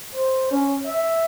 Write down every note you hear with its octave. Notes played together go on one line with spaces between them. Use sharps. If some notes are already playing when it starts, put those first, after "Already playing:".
C5
C#4
E5